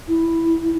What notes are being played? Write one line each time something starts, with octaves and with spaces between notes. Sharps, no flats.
E4